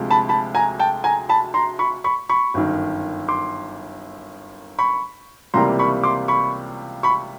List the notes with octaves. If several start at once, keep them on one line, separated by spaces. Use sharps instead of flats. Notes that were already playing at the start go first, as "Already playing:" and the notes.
Already playing: D2 C3 F3 G#3
A5 B5
A5 B5
G#5 A#5
G5 A5
G#5 A#5
A5 B5
A#5 C6
B5 C#6
B5 C#6
B5 C#6
G1 F#2 D#3
C6 D6
B5 C#6
C#2 C3 E3 G3 A#3 A#5 C6
B5 C#6
C6 D6
B5 C#6
B5 C#6